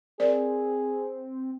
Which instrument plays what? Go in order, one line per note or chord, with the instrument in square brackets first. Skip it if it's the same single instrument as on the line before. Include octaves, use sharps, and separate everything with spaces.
[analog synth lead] C4 [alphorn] G#4 [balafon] A#4 D5